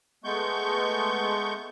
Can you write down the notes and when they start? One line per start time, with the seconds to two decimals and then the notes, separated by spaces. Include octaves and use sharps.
0.24 G#3 A3 B3 C#6 G6